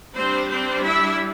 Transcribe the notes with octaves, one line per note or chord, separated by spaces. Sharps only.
G3 C4 D4 C5
C4 C5
E4 E5